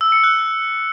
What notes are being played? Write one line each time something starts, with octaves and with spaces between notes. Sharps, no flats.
E6
C#7
F#6